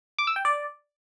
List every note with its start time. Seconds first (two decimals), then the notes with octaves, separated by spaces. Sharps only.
0.19 D6
0.27 E6
0.36 G5
0.45 D5